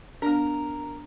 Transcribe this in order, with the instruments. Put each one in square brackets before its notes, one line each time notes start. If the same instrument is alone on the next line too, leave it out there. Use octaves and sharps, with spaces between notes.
[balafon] B3 D4 [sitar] A#4